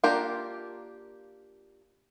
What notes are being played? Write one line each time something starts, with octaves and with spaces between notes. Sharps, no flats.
A#3 D4 F4 G4 A#4